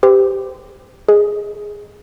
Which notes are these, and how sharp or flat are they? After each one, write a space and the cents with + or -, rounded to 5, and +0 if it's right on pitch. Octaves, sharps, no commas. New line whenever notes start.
G4 +0 C5 -40
G#4 -5 D#5 +0